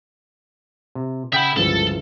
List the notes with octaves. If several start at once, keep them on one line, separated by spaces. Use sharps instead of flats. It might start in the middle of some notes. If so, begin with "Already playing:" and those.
C3
C#3 E5 F#5 G5 B5 D#6
G1 C#2 C#3 E3 F3 A4